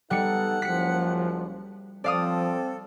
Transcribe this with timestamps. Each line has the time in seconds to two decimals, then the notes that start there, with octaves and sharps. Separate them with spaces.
0.11 G3 B3 D#4 A4 F#5 C#7
0.62 F#1 F3 B6 C#7
2.04 F3 C4 A4 D5 F5 D#6